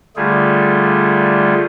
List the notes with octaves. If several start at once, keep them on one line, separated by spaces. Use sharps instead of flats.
D3 G3 A3 F4 G#4